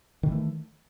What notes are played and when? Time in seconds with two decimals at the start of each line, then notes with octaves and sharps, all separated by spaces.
0.23 D#3
0.27 E3
0.32 A3